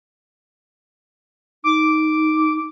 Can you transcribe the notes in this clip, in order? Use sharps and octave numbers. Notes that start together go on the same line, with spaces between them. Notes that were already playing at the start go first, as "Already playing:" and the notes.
D#4 D6